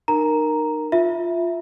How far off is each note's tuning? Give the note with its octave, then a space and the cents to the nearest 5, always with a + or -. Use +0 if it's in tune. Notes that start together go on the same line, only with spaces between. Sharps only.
D#4 -30 A#4 +0 A#5 +0
F4 +0 E5 +0